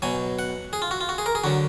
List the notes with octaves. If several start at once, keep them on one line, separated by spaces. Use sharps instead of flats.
B2 F#3 G#5
F#5
G#4
F4
F#4
F4
F#4
G#4
A#4
G#4
D3 F#3 F#4